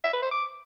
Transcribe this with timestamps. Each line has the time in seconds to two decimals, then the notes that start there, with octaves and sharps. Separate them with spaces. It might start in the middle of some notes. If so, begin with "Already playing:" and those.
0.04 E5
0.13 B4
0.22 C5
0.31 D6